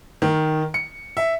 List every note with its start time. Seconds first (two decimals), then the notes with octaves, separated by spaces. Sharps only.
0.22 D#3
0.74 C#7
1.17 E5